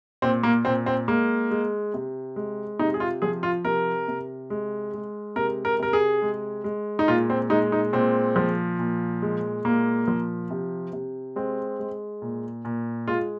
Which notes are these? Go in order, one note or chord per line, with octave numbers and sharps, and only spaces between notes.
A#2 C4
A#3
A#2 C4
C4
G#3 A#3
G#3
C3
G#3
C3 D#4
G#4
F4
F3 G#4
F4
C3 A#4
C3
G#3
G#3
C3 A#4
A#4
C3 A#4
G#4
G#3
G#3
D#4
A#2 F4
C4
G#3 D#4
D#4
A#2 C4
F3
A#2
G#3
A#2 A#3
F3
C3
C3
G#3 C4
G#3
A#2
A#2
G#3 F4